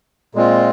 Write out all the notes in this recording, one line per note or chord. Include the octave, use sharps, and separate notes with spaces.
A#2 G#3 C4 F4